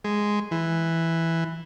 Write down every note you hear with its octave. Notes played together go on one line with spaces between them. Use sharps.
G#3
E3